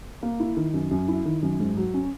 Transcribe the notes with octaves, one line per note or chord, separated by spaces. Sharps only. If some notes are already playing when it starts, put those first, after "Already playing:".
A#3
E4
D#3
F#2
F#2
E4
D#3
F#2
G#2
F#3
C#4